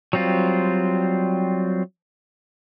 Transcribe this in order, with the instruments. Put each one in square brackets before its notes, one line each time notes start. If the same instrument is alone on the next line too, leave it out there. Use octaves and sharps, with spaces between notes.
[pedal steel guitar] F#3 G3 C4 F4